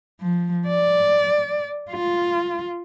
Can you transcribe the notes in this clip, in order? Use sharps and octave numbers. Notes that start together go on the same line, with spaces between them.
F3
D5
F4